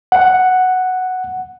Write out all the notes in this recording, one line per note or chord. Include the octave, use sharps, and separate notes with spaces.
F#5